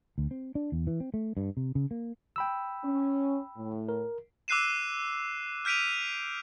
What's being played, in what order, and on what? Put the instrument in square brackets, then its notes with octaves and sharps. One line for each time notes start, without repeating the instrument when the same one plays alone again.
[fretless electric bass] D2
C4
D4
E2
E3
C4
A3
G2
C3
C#3
A#3
[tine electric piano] G5 B5 E6
[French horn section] C#4
A2
[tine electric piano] A#4
[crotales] D6 E6 F#6 C7 D#7 E7
F6 G6 B6 D7 D#7 F7